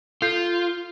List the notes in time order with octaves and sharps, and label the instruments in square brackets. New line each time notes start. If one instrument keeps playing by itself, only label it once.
[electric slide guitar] F4 [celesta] A4 G6 C7